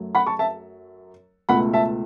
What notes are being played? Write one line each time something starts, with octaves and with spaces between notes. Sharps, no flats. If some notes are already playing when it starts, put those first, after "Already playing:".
Already playing: F#2 F#3 A3
F#5 B5
A5 C#6
E5 A5
C#2 B2 A3 F#5 B5
E5 A5